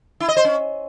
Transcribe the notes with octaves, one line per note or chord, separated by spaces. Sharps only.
E4
D#5
C5
C#4